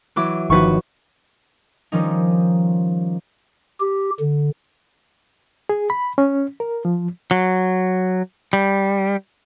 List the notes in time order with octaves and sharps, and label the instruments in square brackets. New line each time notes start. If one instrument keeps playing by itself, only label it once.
[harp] E3 F#3 D6
[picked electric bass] G1 D#3 F3 [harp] F#4 B4 C#6
[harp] D#3 F3 G3 C#4 D#4
[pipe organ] G4
D3
[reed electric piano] G#4
B5
C#4
A#4
F3
[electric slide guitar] F#3
G3